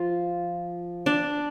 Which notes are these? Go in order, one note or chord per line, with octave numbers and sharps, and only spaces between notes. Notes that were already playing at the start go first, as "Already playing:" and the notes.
Already playing: F3 F4
D4